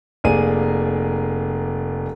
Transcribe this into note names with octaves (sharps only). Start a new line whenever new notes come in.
F1 A#3 G#4 D5 G#5 D#7